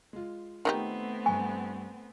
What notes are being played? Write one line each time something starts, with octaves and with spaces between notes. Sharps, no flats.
G#3 F4
D#3 A3 B3 C4 D#4 G4
G2 G#5 C#6